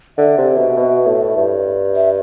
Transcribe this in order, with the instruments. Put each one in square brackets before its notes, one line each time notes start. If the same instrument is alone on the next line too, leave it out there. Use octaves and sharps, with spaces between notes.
[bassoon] D3 [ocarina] E5
[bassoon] C3
B2
B2
A2
G2
[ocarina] E5